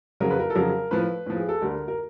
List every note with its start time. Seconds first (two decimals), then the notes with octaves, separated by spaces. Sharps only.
0.20 F2 C#3 F#3 A#4
0.30 B4
0.39 A#4
0.50 A4
0.55 F2 C#3 F#3 A#4
0.91 A2 F3 B4
1.26 A2 F3
1.36 G#4
1.49 A4
1.62 D2 D3 G3 A#4
1.88 A#4